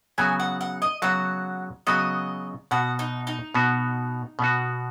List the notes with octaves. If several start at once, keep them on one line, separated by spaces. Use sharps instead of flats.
C#3 F#3 B3 F#4 G#5
F#5
F#5
D#5
C#3 F#3 B3 F#4 F#5
C#3 F#3 B3 F#4 D#5
B2 B3 F#4 F#5
D#4
D#4
B2 B3 F#4
B2 B3 F#4